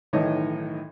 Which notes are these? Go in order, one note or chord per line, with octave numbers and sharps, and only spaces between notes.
B1 A2 D#3 E3 C#5 D#5